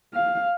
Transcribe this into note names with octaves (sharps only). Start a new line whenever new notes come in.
F5